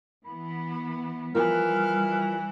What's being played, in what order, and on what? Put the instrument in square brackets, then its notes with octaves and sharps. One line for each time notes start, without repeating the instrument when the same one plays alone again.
[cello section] E3 B3 [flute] B5
[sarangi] E3 [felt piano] F3 A#4 [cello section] G3 [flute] F6